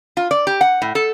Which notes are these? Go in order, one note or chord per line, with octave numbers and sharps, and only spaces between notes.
F4
D5
G4
F#5
A2
A4